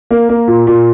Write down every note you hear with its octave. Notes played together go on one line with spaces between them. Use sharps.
A#3
A#3
A#2
A#2